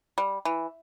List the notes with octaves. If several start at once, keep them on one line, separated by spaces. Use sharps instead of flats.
G3
E3